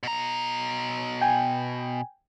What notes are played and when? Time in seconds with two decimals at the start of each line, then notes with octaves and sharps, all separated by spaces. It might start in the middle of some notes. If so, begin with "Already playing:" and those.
0.03 B2 A#5
1.21 G5 G#5